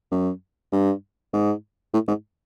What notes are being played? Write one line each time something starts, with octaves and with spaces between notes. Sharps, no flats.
F#2
G2
G#2
A2
G#2